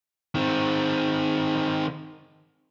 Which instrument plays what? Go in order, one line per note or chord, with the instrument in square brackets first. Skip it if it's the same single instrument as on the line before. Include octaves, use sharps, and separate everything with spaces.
[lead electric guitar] D#3 C4